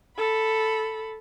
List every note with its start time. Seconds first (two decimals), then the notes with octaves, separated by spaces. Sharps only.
0.18 A4 B5